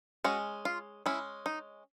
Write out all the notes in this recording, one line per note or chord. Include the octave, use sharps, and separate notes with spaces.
G#3 C#4 F#4
F4
G#3 C#4 E4
D#4